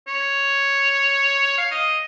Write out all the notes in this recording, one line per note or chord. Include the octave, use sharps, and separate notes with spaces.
C#5
F5
D#5